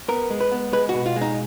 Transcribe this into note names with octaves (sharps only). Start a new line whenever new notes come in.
B3 A#4
G#3
B4
B3
G#3 B4
F#4
B2
F4
G#3
D#4